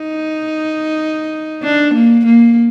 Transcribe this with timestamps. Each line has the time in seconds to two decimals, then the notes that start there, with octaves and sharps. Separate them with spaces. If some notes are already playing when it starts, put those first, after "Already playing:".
Already playing: D#4
1.63 D4
1.94 A#3
2.25 A#3